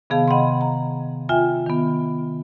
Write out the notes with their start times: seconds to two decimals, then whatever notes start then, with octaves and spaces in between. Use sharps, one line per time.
0.10 C3 D#3 B3 G#4 F5 A5
0.28 D#5 F#5 G5 B5 C6
0.61 A#5
1.29 F4 E5 G5 G#5
1.66 D#3 B3